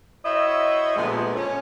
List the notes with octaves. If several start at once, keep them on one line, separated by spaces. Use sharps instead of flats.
E4 F#4 C5 C#5 D#5 E5
A#2 D3 F3 G3 G#3 B3
C#4